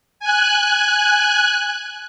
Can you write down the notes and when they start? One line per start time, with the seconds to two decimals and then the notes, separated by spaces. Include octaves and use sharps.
0.20 G#5 F#6